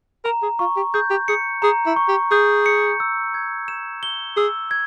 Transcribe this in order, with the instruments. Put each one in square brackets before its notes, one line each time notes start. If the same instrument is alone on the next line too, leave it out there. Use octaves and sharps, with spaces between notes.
[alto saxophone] A#4 [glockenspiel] A#5
[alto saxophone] G#4
[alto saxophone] F4 [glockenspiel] C#6
[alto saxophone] G4
[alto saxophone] G#4 [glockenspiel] G6
[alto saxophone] G4
[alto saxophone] G#4 [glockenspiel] C#7
[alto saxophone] G#4 [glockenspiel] A#5
[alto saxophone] E4
[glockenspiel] C#6
[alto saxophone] G4
[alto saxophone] G#4 [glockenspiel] G6
[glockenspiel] C#7
E6
G#6
E7
G7
[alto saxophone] G#4 [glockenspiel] E6
[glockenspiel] G#6